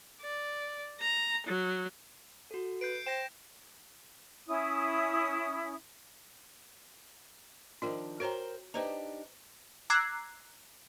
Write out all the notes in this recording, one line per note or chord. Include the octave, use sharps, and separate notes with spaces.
D5
A#5
F#3
F#4 A4
B4 G6 C7 D7
C5 G5 A#6 E7
C#4 E4 D#6
D#3 F3 D4 F4 A#4
F#4 A#4 C5 C#5 G5 A#5
D4 D#4 G4 B4 C5 A#5
A#5 D6 E6 F#6 G#6 C7